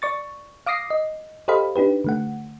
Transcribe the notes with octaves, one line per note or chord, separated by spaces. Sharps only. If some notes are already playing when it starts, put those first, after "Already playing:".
D5 C#6 A6
F5 D6 D#6 A#6 C7
D#5
G4 A4 C5 D#5 F5 B5
D4 D#4 G4 B4
D3 A3 F#5